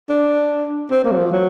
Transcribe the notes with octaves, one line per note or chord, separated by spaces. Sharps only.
D4
C4
A#3
F#3
F3
F#3